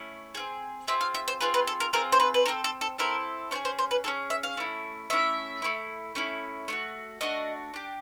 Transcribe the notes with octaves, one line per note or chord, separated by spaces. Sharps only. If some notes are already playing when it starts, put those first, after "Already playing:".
Already playing: A3 C#4 E4
C4 F4 G#4
C4 F4 G#4 E5
F5
E5
C5
C4 F4 G#4 B4
B4
A4
A#4
C4 F4 G#4 A#4
C5
B4
B4
C4 E4 A4 A#4
A4
A4
C4 E4 A4 A#4
C#4 F4 G#4 C5
C5
C5
B4
C#4 F4 G#4 A4
E5
F5
A3 C#4 E4
A3 C#4 E4 E5
A3 C#4 E4
A3 C#4 E4
A3 D4 F#4
A3 D4 F#4 D#5
D4 G4